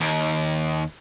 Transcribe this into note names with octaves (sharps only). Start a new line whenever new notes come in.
D#2